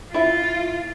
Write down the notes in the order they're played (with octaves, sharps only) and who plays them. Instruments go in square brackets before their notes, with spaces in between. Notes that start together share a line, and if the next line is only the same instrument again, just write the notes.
[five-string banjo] E4 E5 [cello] F4